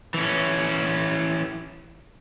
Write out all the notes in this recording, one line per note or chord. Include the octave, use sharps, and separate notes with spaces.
E3 C#4